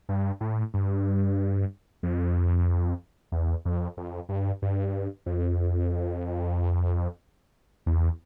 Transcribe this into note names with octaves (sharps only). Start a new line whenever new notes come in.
G2
A2
G2
F2
E2
F2
F2
G2
G2
F2
E2